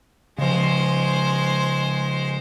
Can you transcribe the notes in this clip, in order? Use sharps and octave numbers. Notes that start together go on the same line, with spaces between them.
C#3 F3 G#3 C5